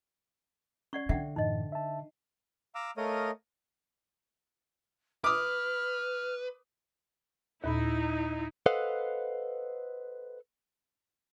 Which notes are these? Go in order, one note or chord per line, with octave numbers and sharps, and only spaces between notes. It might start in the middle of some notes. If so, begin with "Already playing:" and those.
C#4 D5 F#5 C#6 G#6 C7
D3 E5 F#5 G5
F#2 A2 E3 D#4 D#5
E5 A5
F5 A#5 D6 E6
A3 A#4 C#5 D#5 F5 D#6
B4 D6 D#6 F6
D#2 A#2 D#4 E4 B5
A4 B4 C5 D#5 F5 F#5